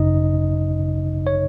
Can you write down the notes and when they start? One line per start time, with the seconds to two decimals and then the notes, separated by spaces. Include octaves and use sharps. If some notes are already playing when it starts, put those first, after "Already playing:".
Already playing: G#1 F#2 C#3 D#4 D#5
1.27 C#5